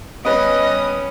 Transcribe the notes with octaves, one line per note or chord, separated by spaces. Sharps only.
G3 B3 C#4 B4 D#5 D#6